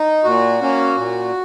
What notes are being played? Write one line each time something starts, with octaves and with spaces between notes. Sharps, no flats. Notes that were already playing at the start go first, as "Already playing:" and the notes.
Already playing: D#4
A#2 F#4
A#3 C#4
A#2